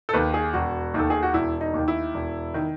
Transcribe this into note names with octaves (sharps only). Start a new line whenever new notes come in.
A4
D#2 D#3 B4
G#4
E1 F#4
D#2 D#3 A4
G#4
F#4
E1 E4
D#4
D#2
D#3
E4
E1
D#3